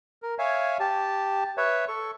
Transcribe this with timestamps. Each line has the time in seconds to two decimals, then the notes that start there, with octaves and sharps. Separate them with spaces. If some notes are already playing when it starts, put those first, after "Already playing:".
0.22 A#4
0.39 C#5 E5 F5 G#5
0.80 G4 A5
1.57 B4 C#5 E5
1.88 A4 C#6